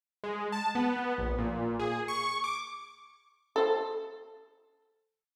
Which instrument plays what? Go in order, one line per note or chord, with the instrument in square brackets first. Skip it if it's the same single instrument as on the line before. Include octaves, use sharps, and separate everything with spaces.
[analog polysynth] G#3
A5
B3
A#1
A#2
G#4
C#6
D6
[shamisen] A4 C5